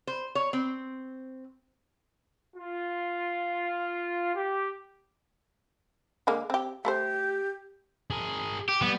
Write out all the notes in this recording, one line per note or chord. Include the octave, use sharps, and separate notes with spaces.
C5
C#5
C4
F4
G4
D3 G#3 A#3
C4 G4
A3 G4 A#4 C5
G#4 A#4
G4
G3 B3